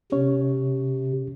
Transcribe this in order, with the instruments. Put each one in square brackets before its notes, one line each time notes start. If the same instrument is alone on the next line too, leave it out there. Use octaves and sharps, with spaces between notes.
[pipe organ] C3 [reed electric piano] C#4 C#5